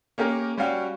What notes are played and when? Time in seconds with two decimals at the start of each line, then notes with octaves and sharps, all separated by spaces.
0.18 A#3 C#4 G4 A#4
0.57 G3 C#4 F#4 F5 G5